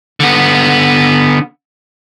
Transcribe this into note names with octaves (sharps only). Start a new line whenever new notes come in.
D3 B3